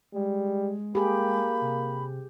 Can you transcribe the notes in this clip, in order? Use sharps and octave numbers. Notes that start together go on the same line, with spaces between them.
G3 G#3
A#3 G4 G#4 B5
C3